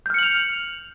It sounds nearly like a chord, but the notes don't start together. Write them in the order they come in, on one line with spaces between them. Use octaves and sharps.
G6 F6 C#7 F#7 F7